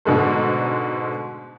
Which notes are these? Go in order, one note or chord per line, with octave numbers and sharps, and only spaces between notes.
G#2 B2 D3 G#3 A3